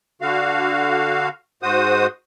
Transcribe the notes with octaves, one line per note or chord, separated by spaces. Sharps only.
D3 F#4 F5
G#2 F#4 C5 D#6